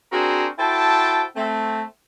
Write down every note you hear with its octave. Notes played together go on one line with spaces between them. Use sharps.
C4 D4 F#4 G#4 A#4 C5
E4 F#4 A4 C5 G5 A5
A3 C4